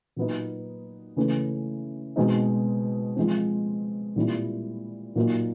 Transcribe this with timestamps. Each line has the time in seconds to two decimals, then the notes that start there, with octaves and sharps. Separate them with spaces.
0.16 A#2 F#3 B3 D#4
1.16 C#3 E3 A3 C#4
2.16 B2 G#3 C4 D#4
3.16 F3 G#3 C4
4.16 A#2 G3 C4 E4
5.16 A#2 F#3 A#3 D#4